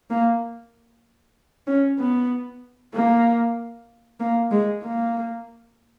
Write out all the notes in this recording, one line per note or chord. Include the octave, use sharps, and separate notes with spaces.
A#3
C#4
B3
A#3
A#3
G#3
A#3